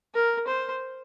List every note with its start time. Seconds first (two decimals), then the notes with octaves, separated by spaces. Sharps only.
0.15 A#4
0.48 C5